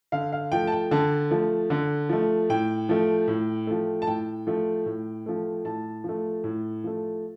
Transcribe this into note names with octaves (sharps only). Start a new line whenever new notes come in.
D3 F5
F5
F3 A3 G5
A5
G5
D3 A5
F3 A3
D3
F3 A3
A2 G5
F3 A3
A2
F3 A3
A5
A2 G5
F3 A3
A2
F3 A3
A2 A5
F3 A3
A2
F3 A3